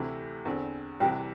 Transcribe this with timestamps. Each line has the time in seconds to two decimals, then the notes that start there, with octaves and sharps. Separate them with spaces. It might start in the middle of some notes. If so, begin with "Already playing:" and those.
Already playing: D2 C3 E3 A3 E4
0.45 E2 D3 C4
1.00 C2 C3 E3 G5